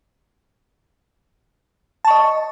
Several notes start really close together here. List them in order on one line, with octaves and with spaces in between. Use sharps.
A5 C#6 D#5